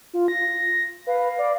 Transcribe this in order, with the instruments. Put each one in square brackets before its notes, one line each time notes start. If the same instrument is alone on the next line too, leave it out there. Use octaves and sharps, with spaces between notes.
[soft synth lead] F4
A#6
[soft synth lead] B4 [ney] F5
[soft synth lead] D5